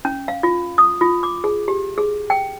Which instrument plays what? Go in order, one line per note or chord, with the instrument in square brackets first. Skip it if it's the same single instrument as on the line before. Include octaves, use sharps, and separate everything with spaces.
[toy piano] C#4
F5
F4
D#6
F4
D6
G#4
G4
G#4
G5